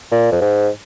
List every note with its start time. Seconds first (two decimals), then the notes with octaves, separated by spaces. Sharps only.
0.12 A#2
0.32 F2
0.41 G#2